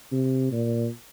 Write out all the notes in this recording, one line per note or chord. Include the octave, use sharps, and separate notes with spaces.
C3
A#2